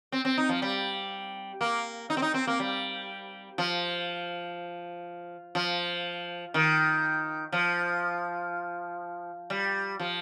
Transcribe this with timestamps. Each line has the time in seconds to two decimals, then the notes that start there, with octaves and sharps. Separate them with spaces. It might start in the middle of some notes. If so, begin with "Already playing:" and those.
0.12 C4
0.25 C4
0.38 D#4
0.49 F3
0.62 G3
1.61 A#3
2.10 D#4
2.17 C4
2.22 D#4
2.34 C4
2.47 A#3
2.60 G3
3.58 F3
5.55 F3
6.54 D#3
7.52 F3
9.50 G3
10.00 F3